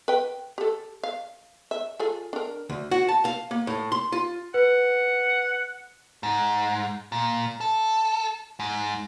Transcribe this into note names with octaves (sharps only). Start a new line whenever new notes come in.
B4 G5
G4 A4
F5
E5
F4 G#4 A4
D4 A#4
D2
F#4
A5
F5
A#3
A2
C6
F4
B4 F#5
G#2
A#2
A4
G#2